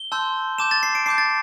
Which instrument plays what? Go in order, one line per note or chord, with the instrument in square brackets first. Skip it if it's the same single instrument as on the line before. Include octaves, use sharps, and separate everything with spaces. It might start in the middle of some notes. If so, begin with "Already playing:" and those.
Already playing: [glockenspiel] G7
A5 C6 E6 G6
A5 D6 G6 E7
A6
C7
D7
A5 D6 G6 C7
A6